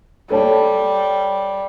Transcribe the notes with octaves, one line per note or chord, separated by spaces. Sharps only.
G3 A4 C#5 A5